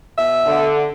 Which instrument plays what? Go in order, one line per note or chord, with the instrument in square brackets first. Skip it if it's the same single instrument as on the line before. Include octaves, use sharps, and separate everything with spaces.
[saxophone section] B2 E5
[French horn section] D3